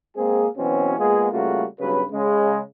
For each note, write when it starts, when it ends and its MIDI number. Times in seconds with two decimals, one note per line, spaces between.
0.16 0.46 56
0.16 0.46 58
0.16 0.46 60
0.16 0.46 68
0.57 0.97 47
0.57 0.97 52
0.57 0.97 54
0.57 0.97 60
0.57 0.97 61
0.98 1.28 56
0.98 1.28 58
0.98 1.28 59
0.98 1.28 65
0.98 1.28 68
1.31 1.65 49
1.31 1.65 55
1.31 1.65 57
1.31 1.65 58
1.31 1.65 65
1.31 1.65 66
1.80 2.04 35
1.80 2.04 43
1.80 2.04 49
1.80 2.04 54
1.80 2.04 71
2.12 2.60 49
2.12 2.60 56